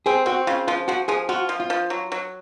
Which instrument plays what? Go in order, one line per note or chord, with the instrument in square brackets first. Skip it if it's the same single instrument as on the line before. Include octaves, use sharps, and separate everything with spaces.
[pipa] C4 [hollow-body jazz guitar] G#4
[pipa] C4 [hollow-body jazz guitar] F#4
[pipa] C#3 [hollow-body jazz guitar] F4
[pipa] F3 [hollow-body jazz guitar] F4
[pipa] F3 [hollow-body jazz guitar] F#4
[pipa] F3 [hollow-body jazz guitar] G#4
[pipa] F4 [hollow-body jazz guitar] F#4
[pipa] F3
[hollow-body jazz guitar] F4
[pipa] F3
F#3
F#3